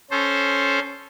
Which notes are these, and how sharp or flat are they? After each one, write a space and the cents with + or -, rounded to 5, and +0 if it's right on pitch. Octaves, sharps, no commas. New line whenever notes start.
C#4 +0 A4 -10 C5 +0